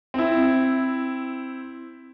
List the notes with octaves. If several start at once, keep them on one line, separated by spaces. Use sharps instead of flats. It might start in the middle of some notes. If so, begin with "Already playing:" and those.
C4 E4